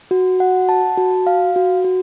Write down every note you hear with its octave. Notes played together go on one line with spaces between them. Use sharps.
F#4
F#5
A5
F#4
F5
F#4
F#4